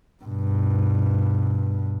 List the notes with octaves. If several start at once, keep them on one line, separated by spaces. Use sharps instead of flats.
G2 B2